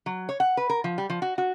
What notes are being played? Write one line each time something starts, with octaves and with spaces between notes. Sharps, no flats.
F#3
C#5
F#5
B4
A#4
F3
G3
F3
F#4
F#4